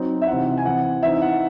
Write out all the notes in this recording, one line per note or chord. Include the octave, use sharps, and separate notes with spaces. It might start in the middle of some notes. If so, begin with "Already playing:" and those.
Already playing: F#3 C4 D#4
E5
C3 E3 C4 D#4 F#5
G#5
E3 C4 E4 F#5
E3 C4 D#4 E5
F#5